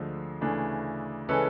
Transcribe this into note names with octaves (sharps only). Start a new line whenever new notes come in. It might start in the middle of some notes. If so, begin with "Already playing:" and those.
Already playing: D2 D3 F3 G#3
D2 C#3 E3 A3 D4
C#3 E3 G#3 C#4 A4 B4